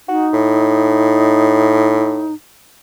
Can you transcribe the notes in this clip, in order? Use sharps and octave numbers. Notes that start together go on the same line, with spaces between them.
D#4 F#4
A2